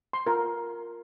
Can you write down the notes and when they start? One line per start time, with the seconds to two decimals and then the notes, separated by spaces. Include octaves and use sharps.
0.13 C6
0.26 F4 A#4